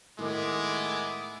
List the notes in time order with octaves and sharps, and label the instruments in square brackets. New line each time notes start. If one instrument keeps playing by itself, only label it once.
[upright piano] A2 D#3 A3 [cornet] G#3 [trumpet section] B3 E4 D6